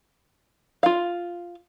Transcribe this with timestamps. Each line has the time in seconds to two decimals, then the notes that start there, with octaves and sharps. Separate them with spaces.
0.83 F4 F5